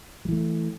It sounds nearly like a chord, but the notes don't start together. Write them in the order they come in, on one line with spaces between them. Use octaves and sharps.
F#3 E3 A3